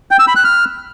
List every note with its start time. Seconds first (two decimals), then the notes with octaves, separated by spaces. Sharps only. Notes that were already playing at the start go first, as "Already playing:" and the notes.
0.11 G5
0.19 E6
0.28 B5
0.36 F#6
0.44 F6